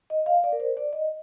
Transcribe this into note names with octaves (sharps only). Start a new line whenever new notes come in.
D#5
F5
D5
A#4
C5
D5
D#5